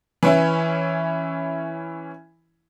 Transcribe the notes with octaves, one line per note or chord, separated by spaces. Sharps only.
E3 C#4 E4